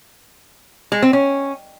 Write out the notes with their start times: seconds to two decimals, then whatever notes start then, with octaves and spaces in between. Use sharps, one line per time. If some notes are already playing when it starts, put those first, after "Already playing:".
0.92 G#3
1.02 C4
1.13 C#4